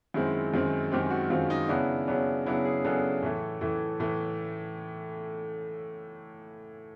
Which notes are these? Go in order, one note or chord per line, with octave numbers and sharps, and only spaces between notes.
F#2 D#3 G#3 C4 E4
F#2 D#3 G#3 C4
F#2 D#3 G#3 C4 G4
F#4
F#2 D#3 G#3 C4 F4
D#4
C#3 F#3 B3 D4 E4
C#3 F#3 B3 D4
C#3 F#3 B3 D4 E4
G#4
C#3 F#3 B3 D4 A4
A2 E3 A3
A2 E3 A3
A2 E3 A3